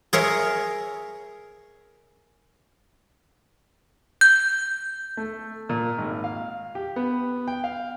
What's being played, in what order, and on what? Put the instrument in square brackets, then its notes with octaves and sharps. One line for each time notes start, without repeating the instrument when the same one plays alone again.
[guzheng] G#4 A#4 C#5 E5
[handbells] G6
[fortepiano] A3
A#2
G#1
F5
G4
B3
G5
F5